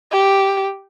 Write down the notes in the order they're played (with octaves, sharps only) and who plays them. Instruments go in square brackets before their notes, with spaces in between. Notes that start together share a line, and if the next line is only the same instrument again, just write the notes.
[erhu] G4